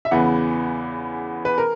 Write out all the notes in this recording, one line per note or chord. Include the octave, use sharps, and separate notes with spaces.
E5
E2 C#3 E3 B3 F#5
B4
A#4